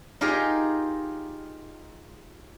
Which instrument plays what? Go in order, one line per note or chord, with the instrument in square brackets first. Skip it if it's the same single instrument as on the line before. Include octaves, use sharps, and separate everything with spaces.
[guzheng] D#4 F4 G4 G#4 A#4 A#5